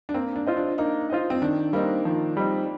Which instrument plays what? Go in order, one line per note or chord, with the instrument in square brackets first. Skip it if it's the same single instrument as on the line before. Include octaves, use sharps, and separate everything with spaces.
[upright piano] D4
[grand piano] A#3 [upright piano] C4
[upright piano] D4
[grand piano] F4 C5 D#5
[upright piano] D4
[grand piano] A#3 [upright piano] D#4
[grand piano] F4 C5 D#5
[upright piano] C4
[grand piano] D#3 [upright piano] D4
[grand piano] G3 C4 D#4 [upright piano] A#3
[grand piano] D#3 [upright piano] F3
[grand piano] G3 C4 D#4